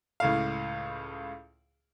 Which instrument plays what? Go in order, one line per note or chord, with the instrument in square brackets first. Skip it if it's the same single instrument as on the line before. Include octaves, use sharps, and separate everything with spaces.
[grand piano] C#2 A2 F5